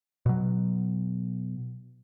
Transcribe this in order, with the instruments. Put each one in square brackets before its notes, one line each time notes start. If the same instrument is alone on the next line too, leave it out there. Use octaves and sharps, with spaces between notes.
[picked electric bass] B2 F#3